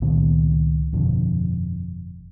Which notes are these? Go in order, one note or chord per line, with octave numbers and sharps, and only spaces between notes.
C#2 A#2 D#3 B3
G1 F2 B2 D3